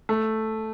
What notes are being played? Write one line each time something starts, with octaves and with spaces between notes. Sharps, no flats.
A3